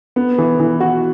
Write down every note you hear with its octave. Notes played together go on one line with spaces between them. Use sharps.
B3
E3
E3
F#4